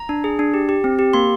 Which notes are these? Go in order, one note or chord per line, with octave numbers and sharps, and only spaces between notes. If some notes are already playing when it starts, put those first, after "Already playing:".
Already playing: A#5
D4
G#4
D4
G4
G4
C4
G4
A#3 C6